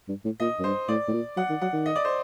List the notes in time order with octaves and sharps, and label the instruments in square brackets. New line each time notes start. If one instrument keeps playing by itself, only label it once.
[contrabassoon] G2
A2
[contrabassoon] A#2 [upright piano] D#5
[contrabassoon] F#2
[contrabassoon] G2 [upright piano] C5
[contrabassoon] A2 [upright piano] D5
[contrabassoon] A2
A#2
[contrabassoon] F#3 [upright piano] F#5
[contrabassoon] D#3
[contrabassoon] F#3 [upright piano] F#5
[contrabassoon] D#3
[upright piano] D#5
D5
C5